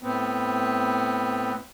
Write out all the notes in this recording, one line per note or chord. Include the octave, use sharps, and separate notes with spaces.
A2 B3 C4